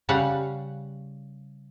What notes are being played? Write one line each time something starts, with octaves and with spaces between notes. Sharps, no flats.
C#3 G3 F5 F#5